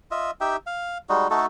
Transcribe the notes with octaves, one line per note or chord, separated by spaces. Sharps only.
F4 D#5 E5
D#4 G4 E5 G5
F5
G3 G#3 D#4 F#4
A3 D#4 F#4 A4